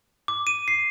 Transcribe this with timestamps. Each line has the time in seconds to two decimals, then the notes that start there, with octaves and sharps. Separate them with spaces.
0.28 D6
0.47 D#7
0.68 C7